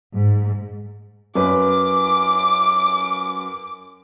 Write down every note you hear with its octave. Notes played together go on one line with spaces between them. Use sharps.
G#2
F#2 B4 D6